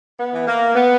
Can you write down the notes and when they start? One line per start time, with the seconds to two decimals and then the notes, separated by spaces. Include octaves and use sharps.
0.19 B3
0.33 E3
0.47 A#3
0.75 B3